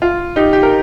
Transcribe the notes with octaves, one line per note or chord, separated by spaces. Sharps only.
F4
D#4 G4
G4
A#4